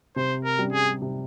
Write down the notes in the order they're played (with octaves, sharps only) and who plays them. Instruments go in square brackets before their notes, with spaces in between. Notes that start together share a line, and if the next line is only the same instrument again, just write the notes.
[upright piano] C3 [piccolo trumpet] C5
[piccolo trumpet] A#4
[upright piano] G3 C#4
[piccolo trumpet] G#4
[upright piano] C3